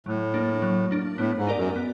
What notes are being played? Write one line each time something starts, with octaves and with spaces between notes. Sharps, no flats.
A2 F#3
A#3 D4
F#3
A#3 D4
A2 B3
G#2
D#4 G4 A#4 D5
F#2
B3